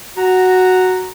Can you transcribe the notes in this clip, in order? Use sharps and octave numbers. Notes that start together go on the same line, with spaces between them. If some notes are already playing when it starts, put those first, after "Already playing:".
F#4 A#5